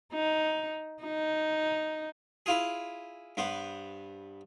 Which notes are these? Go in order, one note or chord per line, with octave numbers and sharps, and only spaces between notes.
D#4
D#4
E4 F4 G#4
G2 B3 C5